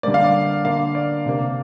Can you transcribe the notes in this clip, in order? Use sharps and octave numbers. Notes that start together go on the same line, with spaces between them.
D3 G3 A#3 D5
F5
D5
D3 A#3 F5
D5
C3 A#3